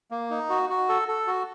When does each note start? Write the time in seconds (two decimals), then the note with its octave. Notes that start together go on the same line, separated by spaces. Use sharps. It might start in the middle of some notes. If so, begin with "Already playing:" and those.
0.11 A#3
0.30 D#4
0.49 F#4
0.70 F#4
0.89 A4
1.08 A4
1.27 F#4